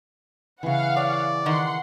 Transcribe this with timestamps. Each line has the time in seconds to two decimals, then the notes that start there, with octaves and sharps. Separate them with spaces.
0.63 C#3 E3 F5 F#5
0.97 C#5 D5
1.46 D#3 F#5 C6